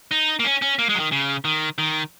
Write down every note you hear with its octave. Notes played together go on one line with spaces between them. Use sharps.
D#4
A#3
C#4
C#4
A#3
G#3
F#3
D#3
C#3
D#3
D#3